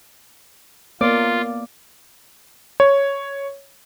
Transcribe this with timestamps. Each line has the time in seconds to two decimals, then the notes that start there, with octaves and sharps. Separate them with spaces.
1.01 A#3 B3 F4 D5
2.80 C#5